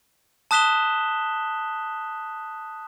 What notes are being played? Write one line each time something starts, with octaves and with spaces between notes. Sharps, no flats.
A5 D#6 F#6 B6 E7 G7